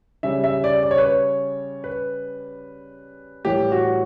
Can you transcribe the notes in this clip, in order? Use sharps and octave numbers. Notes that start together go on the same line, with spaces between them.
C#3 G3 E5
E5
D5
D5
C#5
B4
C#5
B4
A2 E3 G3 G4
F#4